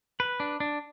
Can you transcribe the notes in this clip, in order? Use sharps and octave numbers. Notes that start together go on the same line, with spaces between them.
B4
D4
D4